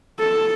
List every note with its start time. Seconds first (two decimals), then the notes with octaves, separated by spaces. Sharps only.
0.19 A4